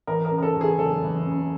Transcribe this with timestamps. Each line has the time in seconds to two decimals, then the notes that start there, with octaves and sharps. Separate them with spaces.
0.07 E3 A#4
0.25 A#4
0.31 C#3
0.38 A#4
0.42 A4
0.55 E2
0.61 G#4
0.79 F#1 A4
1.03 E3
1.26 C#3